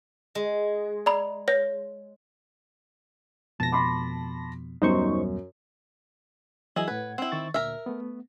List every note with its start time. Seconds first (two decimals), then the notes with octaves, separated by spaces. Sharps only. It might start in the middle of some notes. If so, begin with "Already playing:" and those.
0.35 G#3
1.06 D5 A#5 B5
1.48 B4 C#5 A#6
3.60 F2 B2 A5 A#6
3.72 B5 C6 D6
4.82 D#1 F#2 G3 B3 D#4 C5 C#6
6.76 E3 F#3 E4 G#4 D#5
6.88 A2 B4 F#5 G#6
7.18 C4 E4 F#5
7.32 D#3 C#6 A6
7.54 D2 A#2 A#4 E5
7.86 A3 B3